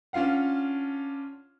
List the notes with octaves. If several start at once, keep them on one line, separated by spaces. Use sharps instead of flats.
C#4 D4 F4 F5 F#5